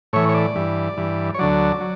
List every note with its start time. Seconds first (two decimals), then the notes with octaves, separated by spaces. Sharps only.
0.13 A2 E3 C#5
0.29 C#5
0.34 D5
0.56 G2 E3
0.97 G2 E3
1.34 C#5
1.39 D2 D3 F#3 D5
1.80 F#3